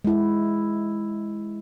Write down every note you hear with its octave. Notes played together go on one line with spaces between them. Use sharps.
G#3 E4